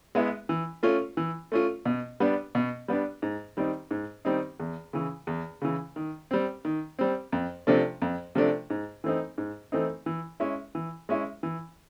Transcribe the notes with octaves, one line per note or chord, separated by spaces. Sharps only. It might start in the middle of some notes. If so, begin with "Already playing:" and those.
G#3 B3 E4
E3
A3 C#4 F4
E3
A3 C#4 F4
B2
G3 B3 D4
B2
G3 B3 D4
G#2
D#3 G3 C4 D#4
G#2
D#3 G3 C4 D#4
E2
C#3 E3
E2
C#3 E3
D#3
G3 C4
D#3
G3 C4
F2
C3 F3 A3 D4
F2
C3 F3 A3 D4
G#2
E3 A3 C4 D#4
G#2
E3 A3 C4 D#4
E3
G#3 C#4 E4
E3
G#3 C#4 E4
E3